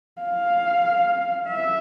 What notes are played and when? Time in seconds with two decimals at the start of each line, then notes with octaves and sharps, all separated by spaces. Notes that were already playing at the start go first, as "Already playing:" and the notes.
0.22 F5
1.48 E5